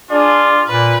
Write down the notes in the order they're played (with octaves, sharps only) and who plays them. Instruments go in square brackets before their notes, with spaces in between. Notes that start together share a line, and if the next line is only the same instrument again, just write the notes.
[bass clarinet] D4 [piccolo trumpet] F4 [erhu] G#4 [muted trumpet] D5
[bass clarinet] A#2 [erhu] B4